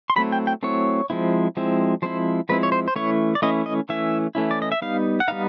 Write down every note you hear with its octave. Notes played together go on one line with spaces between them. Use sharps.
C6
F#3 A3 C4 E4 B5
G5
G5
F#3 A3 C4 E4 C#5
F3 G#3 C4 E4
F3 G#3 C4 E4
F3 G#3 C4 E4 C5
F3 G#3 C4 E4 B4
C#5
C5
C5
E3 A3 C#4 E4 C#5
D5
E3 A3 C#4 E4 D#5
D#5
E3 A3 C#4 E4 E5
E3 A3 C#4 E4
D5
D#5
E5
G3 B3 D#4 F5
F#5
G3 B3 D#4 F5